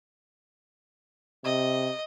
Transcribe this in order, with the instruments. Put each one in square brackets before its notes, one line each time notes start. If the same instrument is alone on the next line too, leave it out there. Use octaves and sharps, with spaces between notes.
[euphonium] C3 [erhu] D#5